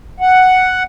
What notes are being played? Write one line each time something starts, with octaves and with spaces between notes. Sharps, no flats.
F#5